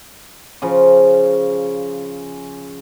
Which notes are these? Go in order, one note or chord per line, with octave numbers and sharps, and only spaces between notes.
C#3 F3